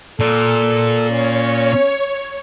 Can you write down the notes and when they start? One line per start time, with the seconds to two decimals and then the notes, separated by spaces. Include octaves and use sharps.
0.20 A#2 A4
1.10 C#4 C#5